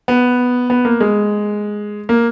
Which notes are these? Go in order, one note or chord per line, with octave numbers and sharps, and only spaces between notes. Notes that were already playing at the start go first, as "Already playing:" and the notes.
B3
B3
A#3
G#3
A#3